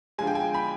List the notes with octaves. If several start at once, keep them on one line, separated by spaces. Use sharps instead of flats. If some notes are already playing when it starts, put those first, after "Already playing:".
D3 F3 G#3 G#5
G5
G#5
B5